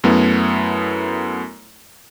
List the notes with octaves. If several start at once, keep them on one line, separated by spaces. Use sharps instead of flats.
F#2 A3 B3 E4